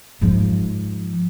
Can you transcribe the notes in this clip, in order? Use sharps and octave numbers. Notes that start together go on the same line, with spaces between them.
G#2 F3